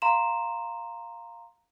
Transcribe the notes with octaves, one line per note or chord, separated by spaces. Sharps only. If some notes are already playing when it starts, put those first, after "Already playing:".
F5 A#5 C6 E7